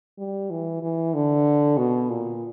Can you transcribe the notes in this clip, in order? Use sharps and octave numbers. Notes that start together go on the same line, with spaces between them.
G3
E3
E3
D3
B2
A#2